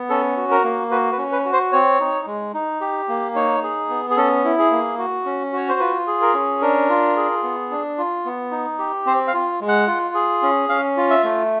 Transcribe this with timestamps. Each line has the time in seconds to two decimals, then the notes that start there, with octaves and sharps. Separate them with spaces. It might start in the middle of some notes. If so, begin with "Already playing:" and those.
Already playing: B3
0.09 C#4 A4
0.37 F#4
0.51 A#4
0.64 A#3
0.91 F#4 B4
1.12 B4
1.18 C#4
1.32 B4
1.45 F#4
1.53 C5
1.72 C4 C#5
2.00 D#4
2.26 G#3
2.54 D#4
2.81 G4
3.09 A#3
3.35 D#4 C#5
3.63 G#4
3.89 B3
4.10 G#4
4.17 C#4 A4
4.44 E4
4.58 G#4
4.71 A#3
4.98 F#4
5.25 C#4
5.53 F#4 C#5
5.69 C5
5.80 F4 B4
6.07 G#4
6.22 A#4
6.34 C#4
6.61 D4 A#4
6.89 F4
7.16 G#4
7.43 B3
7.71 D4
7.98 F4
8.25 B3
8.51 D#4
8.79 G4
9.06 C4 C5
9.27 F5
9.33 F4
9.61 G#3
9.68 F#5
9.87 F4
10.15 G#4
10.42 C#4
10.69 C#4 F5
10.97 F4
11.10 E5
11.24 A3